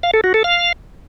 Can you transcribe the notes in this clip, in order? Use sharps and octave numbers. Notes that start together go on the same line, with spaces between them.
F5
A4
F#4
A4
F5